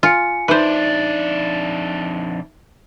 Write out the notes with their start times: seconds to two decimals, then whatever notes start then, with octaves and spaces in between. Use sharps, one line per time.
0.03 F4 G#5 C#7
0.48 F2 D4 D#4 B4 C5 E5